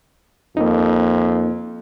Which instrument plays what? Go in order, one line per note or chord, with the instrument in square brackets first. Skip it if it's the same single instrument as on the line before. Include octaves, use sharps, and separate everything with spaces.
[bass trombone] F2 [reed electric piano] A#3 D#4